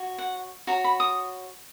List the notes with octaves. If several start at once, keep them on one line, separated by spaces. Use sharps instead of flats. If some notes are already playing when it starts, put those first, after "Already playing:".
Already playing: F#4 C#5
F#5
F#4 C#5 A#5
B5
D#6